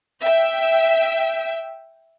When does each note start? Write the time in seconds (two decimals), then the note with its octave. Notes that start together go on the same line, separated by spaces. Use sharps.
0.22 E5 G5